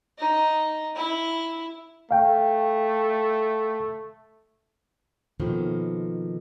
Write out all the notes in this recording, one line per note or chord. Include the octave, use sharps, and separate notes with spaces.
D#4
E4
A3 F5 G5
B2 D#3 F3 A#3 A4